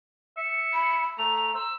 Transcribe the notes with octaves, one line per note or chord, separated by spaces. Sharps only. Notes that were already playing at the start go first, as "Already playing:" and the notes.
E5 C#7
B5
A3 A#5 F7
C5 E6